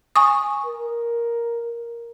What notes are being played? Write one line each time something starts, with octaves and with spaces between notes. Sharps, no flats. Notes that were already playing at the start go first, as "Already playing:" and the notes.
G#5 C#6 D#6
A#4